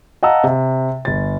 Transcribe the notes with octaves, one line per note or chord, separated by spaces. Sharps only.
D#5 F5 F#5 A5 A#5 E6
C3
G1 A6